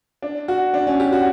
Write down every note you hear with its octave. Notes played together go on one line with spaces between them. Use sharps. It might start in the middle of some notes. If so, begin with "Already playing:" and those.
D4
F#4
D4
C#4
G4
F#4